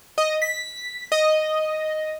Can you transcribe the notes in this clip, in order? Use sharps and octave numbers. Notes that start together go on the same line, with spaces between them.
D#5
B6
D#5